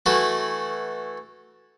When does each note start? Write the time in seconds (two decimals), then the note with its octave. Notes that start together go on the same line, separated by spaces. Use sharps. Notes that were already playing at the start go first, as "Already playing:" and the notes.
0.06 E3 A3 E4 F#4